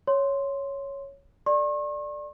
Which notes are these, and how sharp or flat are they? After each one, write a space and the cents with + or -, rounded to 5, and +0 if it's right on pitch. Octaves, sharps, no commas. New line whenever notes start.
C#5 +0 C6 +0
A4 +15 D5 +10 C#6 -45